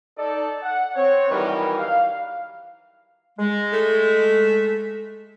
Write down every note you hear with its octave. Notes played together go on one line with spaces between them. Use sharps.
D#4 A4 D5
F#5
C4 C#5
D#3 E3 F#3 G3 A#4 B4
F5
G#3
A3